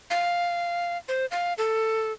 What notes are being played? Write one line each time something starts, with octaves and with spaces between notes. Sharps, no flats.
F5
C5
F5
A4